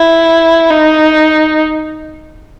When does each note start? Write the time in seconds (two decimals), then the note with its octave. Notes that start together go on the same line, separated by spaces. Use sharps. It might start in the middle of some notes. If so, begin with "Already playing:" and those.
Already playing: E4
0.71 D#4